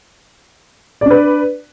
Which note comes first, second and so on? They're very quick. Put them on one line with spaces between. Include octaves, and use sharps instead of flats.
D5 D4 B4